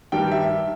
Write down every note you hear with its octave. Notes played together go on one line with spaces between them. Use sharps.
G2 D#3 G3 G5
E5